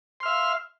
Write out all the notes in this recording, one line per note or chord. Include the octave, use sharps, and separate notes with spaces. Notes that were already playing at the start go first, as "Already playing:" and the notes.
E5 F5 C6 F6